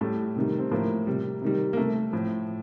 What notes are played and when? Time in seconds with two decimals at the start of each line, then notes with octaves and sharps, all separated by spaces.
0.01 A2 G3 A3
0.36 C3 D#3 G3
0.59 C4
0.71 A2 F3 A#3
1.07 C3 G3
1.42 C3 D#3 G3
1.73 A#3
1.77 C3 G3 A3
2.13 A2 F3